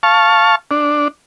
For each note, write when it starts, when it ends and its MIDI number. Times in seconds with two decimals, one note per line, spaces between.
0.03 0.55 77
0.03 0.55 81
0.03 0.55 85
0.71 1.08 62